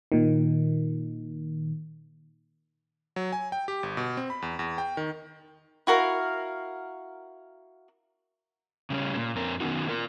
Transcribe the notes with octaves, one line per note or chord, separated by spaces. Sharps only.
A#2 D#3
F#3
G#5
G5
G4
G1
B2
C4
B5
E2
E2
G5
D#3
E4 F#4 A#4 F5
C#3 G3 C#4
A#2
F2 C4 A#4
D#3 B3 C#4 D#4 F#4
F4 A#4